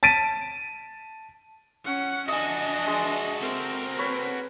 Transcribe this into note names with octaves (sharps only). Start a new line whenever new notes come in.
A5 A6 B6 D7 D#7
C#4 F#5
D4 F#4 A4 D#5 E5 G#5 D#6
G#3
C4 A#4
B4 C#5